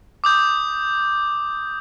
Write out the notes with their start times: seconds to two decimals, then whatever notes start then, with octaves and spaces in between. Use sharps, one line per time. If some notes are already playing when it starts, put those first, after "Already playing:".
0.24 D6 D#6 G6